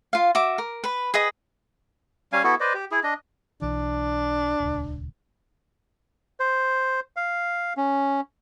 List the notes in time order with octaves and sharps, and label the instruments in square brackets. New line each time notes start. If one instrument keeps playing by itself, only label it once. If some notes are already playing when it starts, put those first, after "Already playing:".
[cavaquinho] F4 F5
F#4 E5 D6
A#4
B4 B5
G#4 B4 D#5 D#6
[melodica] G3 C#4 F5 G#5
B3 E4 F#4 A4
B4 C5 D5 D#5
G4
E4 G#4
D4 D#5
[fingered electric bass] B1 E3 [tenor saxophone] D4
[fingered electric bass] D#1 C#2
[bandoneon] C5
F5
C#4